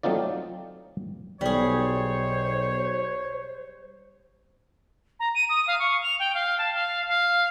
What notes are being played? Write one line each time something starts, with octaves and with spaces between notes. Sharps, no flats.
F#3 A3 C4 D#4 F4 D5
B1 G3 G#4 C5 C#5
A#5
D#7
D#6
F5
C#6
F7
G5
F5
A5
F5
F5